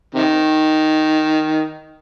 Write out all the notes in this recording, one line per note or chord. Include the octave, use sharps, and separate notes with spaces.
C3 D#3